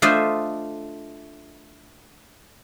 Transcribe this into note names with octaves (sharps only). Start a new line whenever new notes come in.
A3 D4 F4 C5 D#5 E5